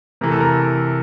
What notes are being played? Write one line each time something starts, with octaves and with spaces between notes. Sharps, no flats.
C3 E3 A3 A#4
A4
A#4